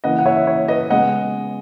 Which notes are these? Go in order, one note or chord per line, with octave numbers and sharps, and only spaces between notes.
C#3 E3 A#3 D#5 F#5
F#5
C#5 E5
C#5
B4 D#5
C#3 G#3 B3 D#5 F#5